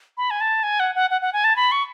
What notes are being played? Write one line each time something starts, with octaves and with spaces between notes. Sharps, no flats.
B5
G#5
A5
G#5
F#5
F#5
F#5
F#5
G#5
A5
B5
C#6